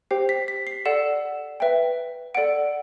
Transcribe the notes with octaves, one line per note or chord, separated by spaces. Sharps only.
G4 C5 G5 C7
B6
B6
C7
A4 D5 F#5 E7
B4 E5 G5
A4 D5 F#5 D7